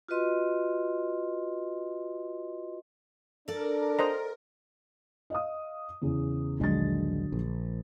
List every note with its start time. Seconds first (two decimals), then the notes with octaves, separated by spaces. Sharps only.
0.08 F4 F#4 B4 D#5 C6
3.48 D4 A4 A#4 D5
3.99 C5 D#5 A#5
5.30 D#5 F5 D#6
6.02 E2 C#3
6.60 A#1 D#2 D3 F#3 G#3 A6
7.32 A#1